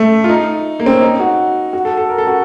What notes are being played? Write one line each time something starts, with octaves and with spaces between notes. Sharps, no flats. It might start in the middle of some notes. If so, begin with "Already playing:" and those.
Already playing: A3
F4
D#4
A#3
C4
C#4
D#4
F#4
F#4
A4
A4
A#4
A4
F#4